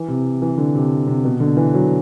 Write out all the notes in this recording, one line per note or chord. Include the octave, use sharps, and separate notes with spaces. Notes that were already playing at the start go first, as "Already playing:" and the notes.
Already playing: E3
C3
E3
D3
C3
C3
B2
D3
E3
F#3